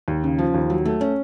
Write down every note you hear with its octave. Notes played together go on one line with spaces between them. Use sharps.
D#2
C#3
F3
D#2
F#3
A3
C#4